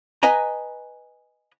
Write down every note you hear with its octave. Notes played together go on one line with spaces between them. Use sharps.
B4 D#5 G#5 A#5